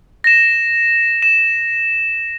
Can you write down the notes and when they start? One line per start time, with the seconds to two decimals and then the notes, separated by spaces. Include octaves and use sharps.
0.24 A#6 E7
1.22 E7